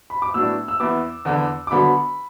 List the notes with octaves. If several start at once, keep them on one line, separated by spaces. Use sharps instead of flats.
B5
D6
A2 F#3 B3 D4 E6
E6
E2 E3 B3 E4 D6
E2 D3 B3
D6
D3 F#3 B3 B5